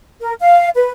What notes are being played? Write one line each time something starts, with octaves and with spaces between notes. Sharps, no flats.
A#4
F5
B4